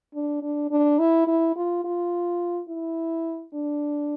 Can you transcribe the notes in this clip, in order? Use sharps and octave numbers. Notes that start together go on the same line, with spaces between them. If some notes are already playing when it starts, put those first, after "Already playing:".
D4
D4
D4
E4
E4
F4
F4
E4
D4